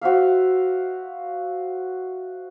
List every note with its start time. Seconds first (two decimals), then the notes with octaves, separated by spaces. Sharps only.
0.01 F#4 C5 E5 F5